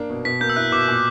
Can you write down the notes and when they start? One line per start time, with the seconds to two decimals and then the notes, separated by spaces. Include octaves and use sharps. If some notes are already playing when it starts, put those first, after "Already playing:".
Already playing: A#3 D4
0.10 B2
0.25 B2 B6
0.40 A#3 G6
0.49 E6
0.56 E4 F#6
0.72 B2 D6
0.88 A#2